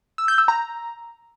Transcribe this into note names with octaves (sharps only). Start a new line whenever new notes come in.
E6
G6
E6
A#5